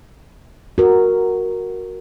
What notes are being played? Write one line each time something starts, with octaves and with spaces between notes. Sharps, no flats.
F#4 A#4